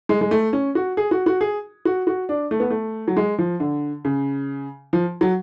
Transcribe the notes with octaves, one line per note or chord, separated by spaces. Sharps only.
G#3
G#3
A3
C#4
F#4
G#4
F#4
F#4
G#4
F#4
F#4
D4
A3
B3
A3
F#3
G#3
F3
D3
C#3
F3
F#3